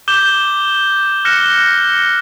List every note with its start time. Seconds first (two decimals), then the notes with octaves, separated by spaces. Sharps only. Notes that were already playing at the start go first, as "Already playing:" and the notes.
0.08 D6 G6 E7 G7
1.25 F6 F#6 A#6 C#7 E7 G7